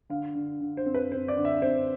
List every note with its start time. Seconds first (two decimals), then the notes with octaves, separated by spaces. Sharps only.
0.09 D3 F5
0.35 D3
0.61 D3
0.77 C5
0.86 C4
0.94 B4
1.12 C4 C5
1.28 D5
1.37 D3
1.45 E5
1.62 C4 C5